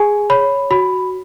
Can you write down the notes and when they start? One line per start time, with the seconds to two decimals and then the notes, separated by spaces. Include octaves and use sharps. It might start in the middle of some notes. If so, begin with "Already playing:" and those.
Already playing: G#4 G#5
0.30 C#5 B5
0.71 F#4 B5